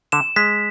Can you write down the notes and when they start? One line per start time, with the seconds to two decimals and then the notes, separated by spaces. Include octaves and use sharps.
0.12 D3 E7
0.36 G#3 B6